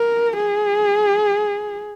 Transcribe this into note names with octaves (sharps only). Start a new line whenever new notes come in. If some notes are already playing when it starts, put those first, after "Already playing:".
Already playing: A#4
G#4